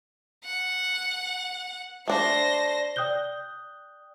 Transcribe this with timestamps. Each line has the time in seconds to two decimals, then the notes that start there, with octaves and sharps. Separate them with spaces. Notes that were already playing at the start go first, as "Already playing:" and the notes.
0.45 F#5
2.08 A3 D4 C5 A#6
2.96 D5 G5 D#6 F#6 G6 G7